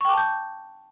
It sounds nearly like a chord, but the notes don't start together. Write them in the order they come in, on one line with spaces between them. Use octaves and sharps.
C#6 G5 D6 A5 G6